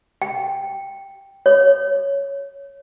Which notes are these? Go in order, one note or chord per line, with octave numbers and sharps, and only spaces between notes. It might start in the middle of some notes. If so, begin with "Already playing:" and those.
G5
C#5